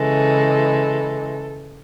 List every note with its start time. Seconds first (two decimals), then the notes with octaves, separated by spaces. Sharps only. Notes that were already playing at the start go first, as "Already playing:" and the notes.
Already playing: C#3 E3 G#3 A4